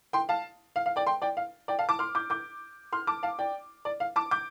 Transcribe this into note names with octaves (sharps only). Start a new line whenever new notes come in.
G5 C6
F5 A5
F5
F5
D5 G5
G5 C6
D5 G5
F5
D5 G5
F5 A5
A5 D6
C6 F6
D6 G6
D6 G6
C6 F6
A5 D6
F5 A5
D5 G5
D5
F5
A5 D6
D6 G6